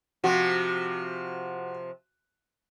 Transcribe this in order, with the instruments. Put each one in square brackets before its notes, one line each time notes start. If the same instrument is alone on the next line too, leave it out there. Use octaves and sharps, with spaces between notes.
[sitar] C3 F3 [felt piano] F#4